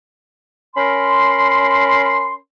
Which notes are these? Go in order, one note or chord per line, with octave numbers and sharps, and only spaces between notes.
C#4 A#4 B5 C6